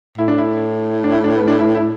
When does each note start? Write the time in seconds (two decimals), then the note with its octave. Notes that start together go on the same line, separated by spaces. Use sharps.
0.18 A2 E4
0.28 D4
0.38 E4
1.04 D4
1.12 E4
1.24 D4
1.36 B3
1.48 D4
1.59 E4
1.75 E4